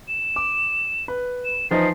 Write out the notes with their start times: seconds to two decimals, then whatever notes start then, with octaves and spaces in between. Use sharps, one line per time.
0.08 E7
0.36 D6
1.08 B4
1.45 E7
1.71 E3 F3 D#4 C7